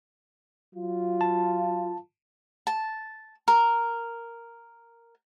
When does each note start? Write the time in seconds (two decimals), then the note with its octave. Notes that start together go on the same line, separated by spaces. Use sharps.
0.75 F#3 F4
1.21 A5
2.67 A5
3.48 A#4